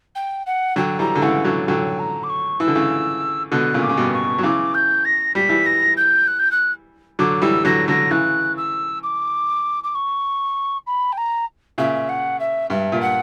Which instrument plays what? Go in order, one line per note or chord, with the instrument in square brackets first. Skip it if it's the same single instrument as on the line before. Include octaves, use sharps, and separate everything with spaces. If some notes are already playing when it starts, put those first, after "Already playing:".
[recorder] G5
F#5
[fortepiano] D3 F#3 [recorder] G5
[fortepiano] E3 G3 [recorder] A#5
[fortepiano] D3
[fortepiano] C#3 E3 [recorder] F#5
[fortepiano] D3 F#3
[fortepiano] D3 F#3 [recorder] G5
[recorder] A#5
D6
C#6
[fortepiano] E3 [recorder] E6
[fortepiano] D3
C#3 E3
[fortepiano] B2 D3 [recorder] F#6
[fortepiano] A#2 C#3
[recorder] D6
[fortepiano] C#3
G2 B2
[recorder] C#6
[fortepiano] F#3
[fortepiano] C#3 E3 [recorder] D6
[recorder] G6
A#6
[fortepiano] G3 [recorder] B6
[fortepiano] E3 G3
[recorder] A#6
G6
F#6
G6
F#6
[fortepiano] D3 F#3 [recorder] D6
[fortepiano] E3 G3 [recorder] E6
[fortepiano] D3 F#3 [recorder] A#6
[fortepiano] D3 F#3 [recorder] A#6
[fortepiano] C#3 E3 [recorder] F#6
[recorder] E6
D6
D6
C#6
B5
G5
A#5
[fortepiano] A#2 C#3 [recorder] E5
[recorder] F#5
E5
[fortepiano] G2 [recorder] E5
[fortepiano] A#2
[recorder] F#5